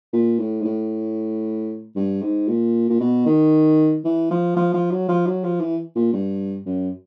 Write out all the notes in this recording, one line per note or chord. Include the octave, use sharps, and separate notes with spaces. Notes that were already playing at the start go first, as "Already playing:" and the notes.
A#2
A2
G#2
A2
G2
G#2
A#2
A#2
B2
D#3
E3
F3
F3
F3
F#3
F3
F#3
F3
E3
A#2
G2
F#2